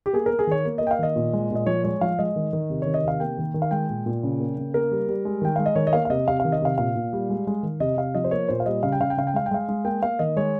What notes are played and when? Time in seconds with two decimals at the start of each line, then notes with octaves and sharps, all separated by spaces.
0.06 G4
0.13 A#3 G#4
0.26 A#3 A#4
0.39 G#4
0.47 D#3 C#5
0.65 A#3
0.78 A#3 D#5
0.87 G5
0.91 F5
0.99 D#3 D#5
1.16 A#2
1.33 G#3
1.51 A#2 D#5
1.66 F3 C#5
1.84 G#3 C#5
2.01 F3 F5
2.19 G#3 D#5
2.36 D#3
2.53 D#3
2.70 C3
2.82 D#3 C#5
2.94 D#5
3.04 C3 F5
3.20 A#3 G5
3.38 D#3
3.54 D#3
3.62 F5
3.71 G#3 G5
3.89 A#2
4.06 A#2
4.23 C#3
4.40 A#3
4.57 C#3
4.74 A#3 A#4
4.91 G3
5.09 G3
5.25 G#3
5.42 D#3 G5
5.56 G#3 F5
5.66 D#5
5.76 D#3 C#5
5.87 D#5
5.93 A#3 F5
6.05 F5
6.10 C3 D#5
6.28 C3 F5
6.40 D#3 F5
6.52 D#5
6.62 C3 F5
6.78 A#2 F5
6.95 A#2
7.13 G3
7.30 G#3
7.47 G#3
7.63 D#3
7.80 C3 D#5
7.97 C3 F5
8.15 F3 D#5
8.24 C5
8.31 A#3 C#5
8.49 A#2 C5
8.60 F5
8.66 G3 D#5
8.83 C#3 F5
8.92 G5
9.00 C#3 F5
9.10 G5
9.17 C#3 F5
9.27 G5
9.34 G#3 F5
9.46 G5
9.51 G#3 F5
9.68 G#3
9.85 A#3 G5
10.02 A#3 F5
10.19 D#3 D#5
10.36 G#3 C#5